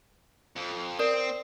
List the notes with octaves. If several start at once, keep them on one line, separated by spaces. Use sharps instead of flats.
F2
C4 A#4 D5